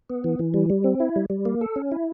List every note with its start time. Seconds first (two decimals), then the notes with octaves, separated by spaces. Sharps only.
0.10 B3
0.24 E3
0.39 E3
0.54 G3
0.70 G3
0.84 C4
1.00 E4
1.16 G3
1.30 G3
1.45 A#3
1.61 A4
1.76 C#4
1.92 E4